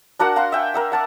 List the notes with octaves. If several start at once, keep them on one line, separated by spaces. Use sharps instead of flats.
D4 F#4 A#4 F#5
F5 F#5 A#5 C6
E5 G5 G#5
A#4 E5 F#5
F#5 A5 D6